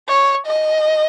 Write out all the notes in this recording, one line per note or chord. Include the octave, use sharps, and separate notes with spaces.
C#5
D#5